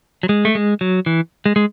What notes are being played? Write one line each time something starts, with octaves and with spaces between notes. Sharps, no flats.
F#3
G#3
A3
G#3
F#3
E3
G#3
G#3